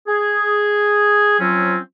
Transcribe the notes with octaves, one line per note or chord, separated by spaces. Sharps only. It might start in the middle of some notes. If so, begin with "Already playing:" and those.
G#4
F3 F#3 C4 C#4